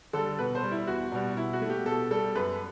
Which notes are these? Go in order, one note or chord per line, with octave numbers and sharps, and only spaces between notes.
D3 G3 A4
B2 B4
C5
G3
E4
E2 F#4
B2 G3
B2 E4
F#4
A3
G4
B2 A4
G3 A4
F#2 B4